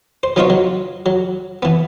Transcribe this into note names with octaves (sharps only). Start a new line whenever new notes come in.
C5
F#3 B3 D#4 F4 C5 C#5
F#3
F#3
E3 B3